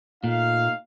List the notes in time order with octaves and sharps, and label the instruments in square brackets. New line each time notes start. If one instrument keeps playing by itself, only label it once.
[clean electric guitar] A#2 [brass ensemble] A3 D#4 F5